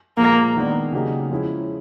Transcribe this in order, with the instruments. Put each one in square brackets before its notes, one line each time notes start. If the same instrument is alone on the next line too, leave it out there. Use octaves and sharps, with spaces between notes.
[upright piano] A#2 F3 G#3 [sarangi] A#3
[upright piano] D#3 G#3 B3 D4
C#3 F#3 A#3 D#4 G4
F3 G#3 C#4 E4